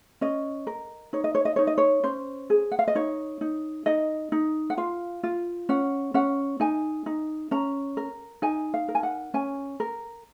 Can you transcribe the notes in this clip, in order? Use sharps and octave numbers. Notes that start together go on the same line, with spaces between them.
C#4 D#5
A#4
D#4 C#5
D#5
C#5
D#5
D#4 C#5
D#5
C#5
C#4 C5
G#4
F#5
F5
D#5
D#4 C#5
D#4
D#4 D#5
D#4
F#5
F4 F5
F4
C#4 F#5
C#4 F#5
D#4 G#5
D#4
C#4 A#5
A#4
D#4 G#5
F5
A#4
G#5
F#5
C#4 G#5
A#4